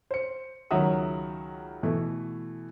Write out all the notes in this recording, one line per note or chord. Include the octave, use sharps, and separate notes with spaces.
C5 C#7
C#2 D#3 F#3 E5 F#5 D#6
B2 E3 A3